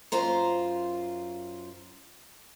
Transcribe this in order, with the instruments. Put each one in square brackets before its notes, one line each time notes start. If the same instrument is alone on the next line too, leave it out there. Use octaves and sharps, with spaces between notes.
[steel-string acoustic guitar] F#2 F4 C5 A#5